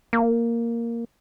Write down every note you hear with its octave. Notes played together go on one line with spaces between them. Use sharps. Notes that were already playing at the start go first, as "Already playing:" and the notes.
A#3